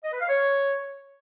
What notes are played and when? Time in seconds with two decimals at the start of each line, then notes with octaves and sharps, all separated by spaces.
0.04 D#5
0.12 B4
0.21 F5
0.29 C#5